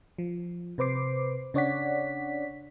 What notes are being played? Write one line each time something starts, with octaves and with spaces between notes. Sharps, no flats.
F3
C3 B4 C5 D6 C7
C#3 D4 C#5 D5 F#5 B6